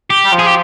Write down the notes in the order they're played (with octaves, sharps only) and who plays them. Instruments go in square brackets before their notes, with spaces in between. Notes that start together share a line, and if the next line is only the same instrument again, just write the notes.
[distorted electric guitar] G4
[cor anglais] G3
F3
[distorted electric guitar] G#4
G4